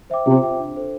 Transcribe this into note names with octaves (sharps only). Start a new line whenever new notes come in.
C5 E5 G5 D6
C3 F4
C5 E5 G5 D6
D4
A4 C5